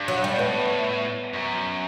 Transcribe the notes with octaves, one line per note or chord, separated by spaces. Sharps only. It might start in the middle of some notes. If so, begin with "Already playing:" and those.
Already playing: G2
F#3
G3
B2
A2 B3
F#2